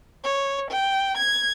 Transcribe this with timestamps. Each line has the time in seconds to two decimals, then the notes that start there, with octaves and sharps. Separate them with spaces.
0.24 C#5
0.70 G5
1.17 G#6